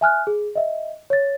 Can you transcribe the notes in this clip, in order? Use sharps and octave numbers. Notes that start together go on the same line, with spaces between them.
E5 G#5 F6 F#6
G#4
D#5 E5
C#5 A6